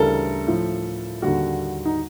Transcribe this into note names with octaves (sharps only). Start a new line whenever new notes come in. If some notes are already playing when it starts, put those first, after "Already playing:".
Already playing: D2 C#3 E3 G3 A4 A#4
A2 F3
D#2 D3 G3 F#4
D#4